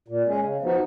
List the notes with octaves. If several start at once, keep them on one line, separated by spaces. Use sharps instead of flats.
A#2
G#3 C#4 G#4
C#3
F3 B3 D#4 F#4